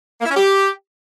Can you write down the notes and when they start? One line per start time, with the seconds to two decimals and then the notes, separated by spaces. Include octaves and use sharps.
0.20 A#3
0.26 E4
0.31 C#4
0.36 G4